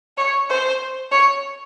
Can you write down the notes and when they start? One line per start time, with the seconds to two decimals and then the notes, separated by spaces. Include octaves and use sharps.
0.17 C#5
0.50 C5
1.11 C#5